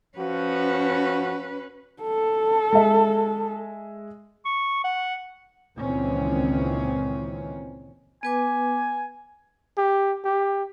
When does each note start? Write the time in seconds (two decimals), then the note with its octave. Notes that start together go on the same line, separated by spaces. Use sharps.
0.17 F3 C#4 F#4 B4
2.03 A4
2.73 G#3 E5
4.45 C#6
4.84 F#5
5.78 C#2 A#2 D#3 E3 C4 C#4
8.23 B3 B4 G#5 D6
9.77 G4
10.25 G4